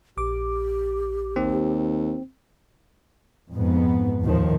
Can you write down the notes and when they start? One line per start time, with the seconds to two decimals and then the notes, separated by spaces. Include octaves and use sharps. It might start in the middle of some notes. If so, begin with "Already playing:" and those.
0.17 A#1 G4 D6
1.36 D#2 C4
3.53 F2 G#2 B3
4.22 D#2 A2 D#3 F3